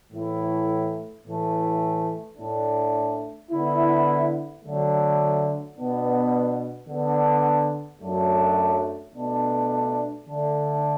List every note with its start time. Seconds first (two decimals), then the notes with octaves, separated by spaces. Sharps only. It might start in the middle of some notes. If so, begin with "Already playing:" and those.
0.11 A2 E3 A3 E4
1.25 A2 E3 A3
2.37 A2 A3 D4
3.50 D3 B3 E4
4.63 D3 F#3 A3
5.76 B2 B3 D4
6.88 D3 B3 D4
8.00 F#2 F#3 A3 D4
9.14 B2 A3 D4
10.27 D3 A3 D4